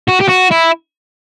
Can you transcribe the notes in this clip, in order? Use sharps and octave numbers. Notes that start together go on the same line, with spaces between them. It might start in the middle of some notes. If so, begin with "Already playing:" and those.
F#4
G4
F#4
E4